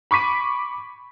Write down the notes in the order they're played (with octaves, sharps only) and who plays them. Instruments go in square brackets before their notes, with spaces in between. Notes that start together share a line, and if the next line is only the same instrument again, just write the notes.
[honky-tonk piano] B5 C#6 D6 B6 D#7